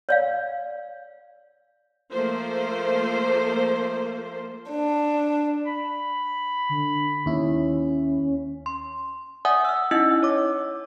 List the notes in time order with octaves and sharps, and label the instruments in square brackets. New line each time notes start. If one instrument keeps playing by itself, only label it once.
[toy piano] C#5 D5 F5
[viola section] F3 A3 A#3 C5
[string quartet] D4
[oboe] B5
[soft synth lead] D3
[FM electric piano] D#2 E4 [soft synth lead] C#4
[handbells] C6
D5 E5 F#5 G#5 D#6
E6 F6
C#4 D#4 E4 D#5 E6
C#5 D6